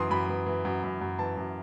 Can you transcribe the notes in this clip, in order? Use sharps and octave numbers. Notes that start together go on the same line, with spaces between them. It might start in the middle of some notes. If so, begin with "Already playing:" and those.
Already playing: F#2 E3 C6 D#6
F#2 B5
E3
E3
F#2
F#2
F#2
E3 A5
F#2